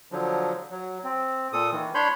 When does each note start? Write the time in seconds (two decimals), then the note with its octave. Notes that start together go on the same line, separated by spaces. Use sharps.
0.12 D3 F3 F#3
0.71 F#3
1.04 C4
1.53 A#2 A4 D#6
1.72 D#3 E3
1.95 D4 C#5 B5 C6 G6